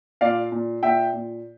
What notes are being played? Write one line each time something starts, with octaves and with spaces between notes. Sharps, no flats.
A#2 D5 F5
A#2
A#2 E5 G5
A#2